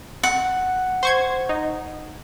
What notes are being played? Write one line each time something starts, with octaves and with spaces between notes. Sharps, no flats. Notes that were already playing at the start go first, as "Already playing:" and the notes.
F#5
C5 C#6 G#6
D#4